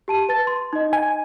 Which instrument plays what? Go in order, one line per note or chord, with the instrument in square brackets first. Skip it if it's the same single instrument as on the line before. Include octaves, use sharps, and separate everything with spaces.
[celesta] G4 A5 D#7
B4 A5 A6
C6
D#4 D#5
[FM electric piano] G#5